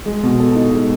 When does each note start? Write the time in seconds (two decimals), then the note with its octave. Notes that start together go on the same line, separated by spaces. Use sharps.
0.06 G#3
0.23 B2
0.40 A4
0.55 D#4
0.73 G#3